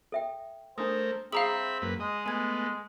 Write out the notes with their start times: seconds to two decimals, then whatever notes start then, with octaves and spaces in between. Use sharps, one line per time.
0.12 A4 E5 G5
0.78 A3 D4 A#4 C5 D#6
1.32 C4 G#4 E5 F5 A#5 B5 D#6 F#7
1.82 F#2 A#3 B4
2.00 G#3 D#5
2.26 A3 B3 G#5 G#6